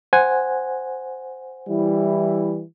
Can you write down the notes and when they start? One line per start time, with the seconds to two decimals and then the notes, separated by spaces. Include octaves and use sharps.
0.13 C5 F#5 G#5
1.68 E3 G3 E4